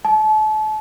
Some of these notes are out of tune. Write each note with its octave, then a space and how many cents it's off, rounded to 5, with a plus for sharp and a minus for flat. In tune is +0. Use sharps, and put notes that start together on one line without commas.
A5 -35